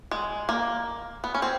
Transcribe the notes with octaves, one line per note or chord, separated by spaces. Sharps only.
G#3
A#3
B3
C#4
C4